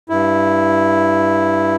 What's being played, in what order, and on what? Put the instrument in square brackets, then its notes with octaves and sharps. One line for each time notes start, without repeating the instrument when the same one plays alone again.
[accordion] G2 E4